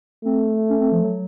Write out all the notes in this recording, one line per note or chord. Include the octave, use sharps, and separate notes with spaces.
A3 C4
C#4
C4
F3
F#3